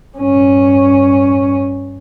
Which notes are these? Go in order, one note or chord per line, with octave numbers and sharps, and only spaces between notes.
G2 C#4